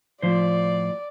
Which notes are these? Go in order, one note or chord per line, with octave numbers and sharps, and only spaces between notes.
A2 F3 C5 D5